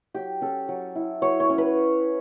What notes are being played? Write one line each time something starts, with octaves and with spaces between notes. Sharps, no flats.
F#3 G4
C#4 A4
F#3
E4
F#3 C#5
C#5
C#4
B4